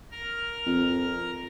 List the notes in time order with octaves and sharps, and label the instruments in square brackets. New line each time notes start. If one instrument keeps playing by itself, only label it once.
[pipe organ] A#4 A#5 F6
[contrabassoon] F2